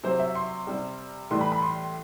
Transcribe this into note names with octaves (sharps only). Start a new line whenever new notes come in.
C3 F#3 C5
E5
C6
C3 G3
A2 E3 G3 C6
B5
B5
C6